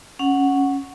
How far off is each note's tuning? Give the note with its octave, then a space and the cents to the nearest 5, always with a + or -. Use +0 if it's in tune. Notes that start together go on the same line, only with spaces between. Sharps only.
C#4 +0 F#5 +0